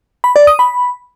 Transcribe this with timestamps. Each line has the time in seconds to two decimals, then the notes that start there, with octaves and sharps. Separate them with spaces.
0.24 B5
0.36 D5
0.47 D#6
0.59 B5